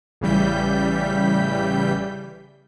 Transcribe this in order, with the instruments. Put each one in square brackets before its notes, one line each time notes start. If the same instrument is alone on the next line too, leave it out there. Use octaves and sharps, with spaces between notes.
[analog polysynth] A1 C#3 E3 G3 G6 B6